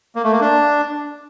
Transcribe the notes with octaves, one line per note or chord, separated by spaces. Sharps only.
A#3
A3
A#3
D4